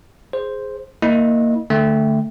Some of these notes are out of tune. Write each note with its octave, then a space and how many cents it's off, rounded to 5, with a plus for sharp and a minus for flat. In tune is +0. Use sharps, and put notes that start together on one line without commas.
G#4 +0 C5 +0
A#3 -10 E4 -30 D#5 -15
D3 +0 A3 +0 G5 +0